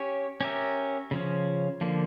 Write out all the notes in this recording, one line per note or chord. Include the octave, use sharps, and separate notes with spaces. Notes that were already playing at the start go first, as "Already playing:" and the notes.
Already playing: C#4 G4 C#5
C#4 G4 A#4 E5
C#3 F3 C#4
D3 F3 A#3